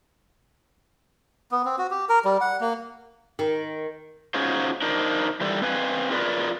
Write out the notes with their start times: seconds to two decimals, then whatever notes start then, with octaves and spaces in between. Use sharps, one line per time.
1.52 B3
1.65 C4
1.79 F#4
1.91 G4
2.09 A#4
2.25 G3
2.41 F#5
2.61 A#3
3.39 D#3
4.34 C#4 D#4 F4 F#4 G#4 C5
4.82 D4 D#4 A#4 C5
5.41 E3 G3 G4 A4 D5
5.62 C4 B4 F5 G#5
6.11 F4 G#4 A#4 B4 D5